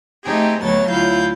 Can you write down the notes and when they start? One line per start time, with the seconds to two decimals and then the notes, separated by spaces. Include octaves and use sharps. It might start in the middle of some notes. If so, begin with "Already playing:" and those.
0.24 A3 C4 D#4 G4 G#4
0.62 D2 F#3 A3 B3 C#5 A6
0.91 D2 E4 F4 F5 G6